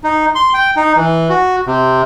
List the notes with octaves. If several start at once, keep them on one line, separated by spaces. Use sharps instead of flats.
D#4
C6
G5
D#4
E3
F#4
C3